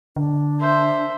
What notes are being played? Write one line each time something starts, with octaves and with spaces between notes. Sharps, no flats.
D3 D4
C5 E5